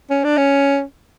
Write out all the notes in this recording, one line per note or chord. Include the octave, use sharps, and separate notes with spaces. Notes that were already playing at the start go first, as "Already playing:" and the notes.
C#4
D4
C#4